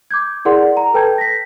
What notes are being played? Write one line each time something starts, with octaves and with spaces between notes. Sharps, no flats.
D6 G6 G#6
E4 G#4 A#4 D5 F#5 C6
A#5
A4 B4 G5 A5 G6 G#6
A#6 B6